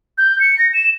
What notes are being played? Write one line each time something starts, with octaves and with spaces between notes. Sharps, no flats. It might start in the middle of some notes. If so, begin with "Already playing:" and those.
G6
C#7
A#6
E7